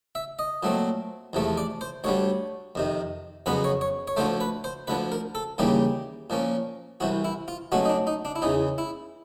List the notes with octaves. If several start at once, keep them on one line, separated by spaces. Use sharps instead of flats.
E5
D#5
A#2 F#3 A3 C4
E2 C3 F3 A3
D5
C5
D2 D3 G3 C#5
F2 C3 D#3
F2 C#3 F#3 B3 B4
C#5
C#5
C#5
D2 D3 F3 A3 C5
B4
C5
D2 D3 F3 B4
A#4
A4
D#2 C#3 E3 G3 A#3 G4
A#2 F3 A#3 C#4
C2 C3 E3 F#4
E4
F4
B2 F#3 A3 C#4 F#4
D#4
D4
D#4
D4
E4
E2 C#3 E3 D#4
E4